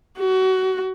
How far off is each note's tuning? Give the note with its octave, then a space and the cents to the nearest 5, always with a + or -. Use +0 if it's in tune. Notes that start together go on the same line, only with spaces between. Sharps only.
F#4 +25